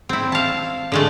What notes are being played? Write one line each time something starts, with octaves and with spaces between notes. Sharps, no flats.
C4 E4
F5 A5
D3 G#3 A3